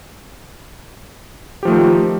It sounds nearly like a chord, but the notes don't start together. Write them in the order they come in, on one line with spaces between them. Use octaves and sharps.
G4 F3 A3 D#3